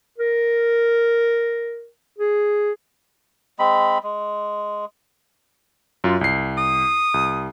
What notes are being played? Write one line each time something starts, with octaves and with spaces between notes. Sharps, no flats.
A#4
G#4
G#3 C4 B5
G#3
F#2 F4
C2 C7
D#6
C2